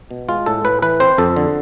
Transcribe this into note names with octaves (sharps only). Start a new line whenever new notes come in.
B2
G#3 F4
A2 A4
A2 B4
E3 B4
C4 C5
F2 A4
D3